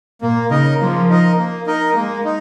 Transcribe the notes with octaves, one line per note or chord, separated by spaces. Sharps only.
A#2 A#3
C#3 D#4 A#4 D#5
F3 A#3
D#4 A#4 D#5
A#3
D#4 A#4 D#5
G#3 A#3
D#4